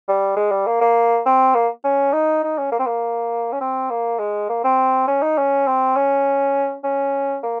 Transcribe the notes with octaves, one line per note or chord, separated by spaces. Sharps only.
G3
G#3
G3
A#3
A#3
C4
A#3
C#4
D#4
D#4
C#4
A#3
C4
A#3
C#4
C4
A#3
G#3
A#3
C4
C#4
D#4
C#4
C4
C#4
C#4
A#3